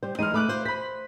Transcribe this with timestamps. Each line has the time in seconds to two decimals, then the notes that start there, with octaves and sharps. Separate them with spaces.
0.03 G3 C5
0.19 E3 G#3 D#4 F6 D#7
0.34 A3 B5 D6 F#6
0.48 F4 C5
0.65 C5 B5 B6